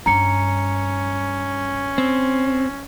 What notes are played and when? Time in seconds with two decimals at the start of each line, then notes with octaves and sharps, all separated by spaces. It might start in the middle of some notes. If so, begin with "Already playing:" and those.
0.06 G2 C#4 D4 A#5 C#7
1.98 C4